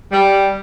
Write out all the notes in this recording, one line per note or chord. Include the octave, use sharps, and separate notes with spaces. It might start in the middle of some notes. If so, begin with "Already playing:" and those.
G3